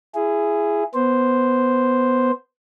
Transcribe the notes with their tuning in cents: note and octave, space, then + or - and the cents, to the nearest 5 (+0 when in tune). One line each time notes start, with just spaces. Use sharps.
E4 +25 G#4 +0
B3 +0 C5 +0